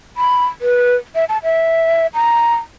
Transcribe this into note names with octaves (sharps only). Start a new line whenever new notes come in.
B5
B4
E5
A5
E5
A#5